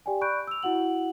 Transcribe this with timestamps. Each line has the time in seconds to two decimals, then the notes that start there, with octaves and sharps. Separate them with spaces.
0.06 G4 D5 G5 G#5
0.21 D5 B5 C#6 F#6 G6 D7
0.47 E6 F7
0.63 E4 F#4 F#5 F#7